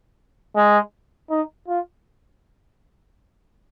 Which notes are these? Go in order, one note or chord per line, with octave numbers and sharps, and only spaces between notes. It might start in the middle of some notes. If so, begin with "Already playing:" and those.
G#3
D#4
F4